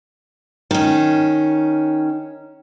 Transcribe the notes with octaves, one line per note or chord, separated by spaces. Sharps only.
D#3 C#4